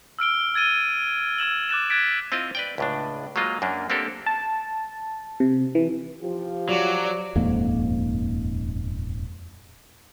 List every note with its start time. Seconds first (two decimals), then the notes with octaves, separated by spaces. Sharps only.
0.19 E6 F6 D7 G7
0.54 E6 G#6 A6 D#7 G7
1.38 E6 G#6 E7 F#7
1.69 D6 F#6 A6 E7
1.90 F#6 G#6 A6 B6 D7
2.32 C4 E4 F4 D#5
2.55 B4 D5 G5
2.78 C#2 A2 D4
3.36 F#3 G#3 A#3 F4 D#5
3.62 F#2 A#3 D4
3.90 A#3 C4 D4 G4 A4 A#4
4.26 A5
5.40 C3
5.75 E3
6.23 F3 F4 G4
6.69 F#3 D5
7.35 D#1 F2 G#2 A#3